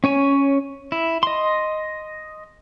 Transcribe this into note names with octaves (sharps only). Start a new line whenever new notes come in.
C#4 C#5 G#5
E4
D#5 C6